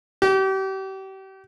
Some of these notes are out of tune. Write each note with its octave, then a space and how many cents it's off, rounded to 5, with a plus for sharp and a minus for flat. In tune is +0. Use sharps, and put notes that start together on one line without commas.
G4 -35